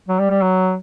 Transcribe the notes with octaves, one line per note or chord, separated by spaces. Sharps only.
F#3
G3
G3
F#3